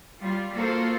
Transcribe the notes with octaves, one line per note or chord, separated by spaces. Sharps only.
G3 F4
A#3 F4 F#4 A4 A#4 C5